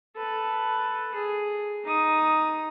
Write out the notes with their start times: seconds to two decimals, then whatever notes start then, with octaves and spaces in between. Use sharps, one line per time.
0.16 A4 B4
1.15 G#4
1.85 D#4 D#6